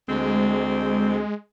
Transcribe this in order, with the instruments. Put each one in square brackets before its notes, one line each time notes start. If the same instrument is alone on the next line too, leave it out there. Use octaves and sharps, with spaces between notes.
[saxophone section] D2 C4 [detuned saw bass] G#3